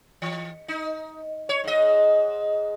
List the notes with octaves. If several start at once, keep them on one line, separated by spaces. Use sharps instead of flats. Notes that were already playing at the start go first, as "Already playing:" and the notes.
E3
D#4
C#5
G#2 D#5